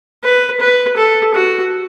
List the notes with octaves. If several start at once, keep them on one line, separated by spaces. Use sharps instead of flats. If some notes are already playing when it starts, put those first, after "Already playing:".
B4
B4
A4
F#4